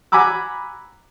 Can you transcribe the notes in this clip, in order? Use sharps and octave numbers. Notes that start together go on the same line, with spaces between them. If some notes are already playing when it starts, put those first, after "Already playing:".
F#5 G#5 A#5 B5 D6 E6